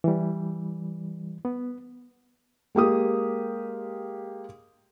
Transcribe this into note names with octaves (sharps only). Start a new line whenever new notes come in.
E3 G3
B3
G#3 A#3 G4 D#6